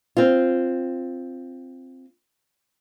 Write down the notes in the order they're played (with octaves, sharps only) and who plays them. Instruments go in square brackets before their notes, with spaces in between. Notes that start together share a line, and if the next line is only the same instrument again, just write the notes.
[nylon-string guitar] C4 F4